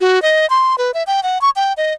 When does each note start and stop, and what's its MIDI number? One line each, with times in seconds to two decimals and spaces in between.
0.01 0.22 66
0.22 0.48 75
0.50 0.76 84
0.78 0.91 71
0.94 1.03 76
1.07 1.23 79
1.23 1.41 78
1.41 1.50 85
1.56 1.73 79
1.77 1.93 75